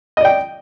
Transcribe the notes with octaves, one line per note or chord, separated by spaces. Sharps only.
D5 D#5 G5